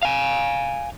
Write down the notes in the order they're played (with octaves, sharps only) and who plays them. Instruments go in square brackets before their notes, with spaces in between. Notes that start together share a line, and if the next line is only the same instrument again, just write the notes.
[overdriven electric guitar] F5 G#5